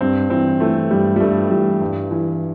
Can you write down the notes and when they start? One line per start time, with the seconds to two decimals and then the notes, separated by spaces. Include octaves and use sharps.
0.01 G2 C4
0.30 E3 C4
0.60 E3 A3
0.91 G2 G3
1.16 G3
1.20 G2 A3
1.50 E3 G3
1.81 G2
2.11 E3